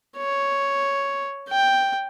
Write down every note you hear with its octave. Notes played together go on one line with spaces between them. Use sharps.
C#5
G5